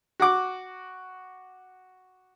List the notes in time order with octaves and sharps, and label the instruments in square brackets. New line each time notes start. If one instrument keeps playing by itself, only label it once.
[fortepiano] F#4 F#5 D6